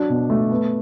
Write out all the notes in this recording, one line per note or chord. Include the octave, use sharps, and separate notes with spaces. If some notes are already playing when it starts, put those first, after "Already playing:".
Already playing: F#3 D4
B2
A3
B3